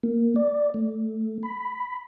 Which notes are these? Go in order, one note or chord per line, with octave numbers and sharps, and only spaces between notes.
A#3
D5
A3
B5